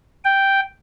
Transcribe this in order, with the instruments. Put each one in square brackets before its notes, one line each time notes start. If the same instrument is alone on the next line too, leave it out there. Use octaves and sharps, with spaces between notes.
[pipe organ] G5